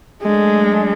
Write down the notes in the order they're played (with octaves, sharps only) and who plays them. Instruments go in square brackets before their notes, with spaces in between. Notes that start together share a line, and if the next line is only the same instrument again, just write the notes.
[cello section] F#3 A3 D4 A4 [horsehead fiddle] G#3